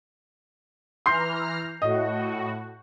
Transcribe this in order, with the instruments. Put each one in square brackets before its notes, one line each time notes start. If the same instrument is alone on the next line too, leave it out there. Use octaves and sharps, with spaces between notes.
[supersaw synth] E3 A#5 F6 [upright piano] C6 G6 C7
[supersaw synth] A2 F#4 [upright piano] D#5